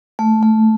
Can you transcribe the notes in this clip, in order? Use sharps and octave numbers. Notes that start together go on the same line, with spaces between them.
A3
A3